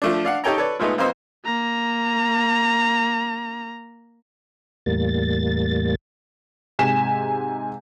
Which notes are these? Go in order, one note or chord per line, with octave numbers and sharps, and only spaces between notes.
F3 A3 D4
D4 F5 F#5
D#4 G4 A4 C#5 G5 A#5
A4 B4 C#5 D5
A#2 G#3 A3 B3 D#4
F2 A#3 B3 C5 D#5 E6
A#3 A#5
E2 A2 G3 A#3 A6
G#2 C3 G#5 B6 E7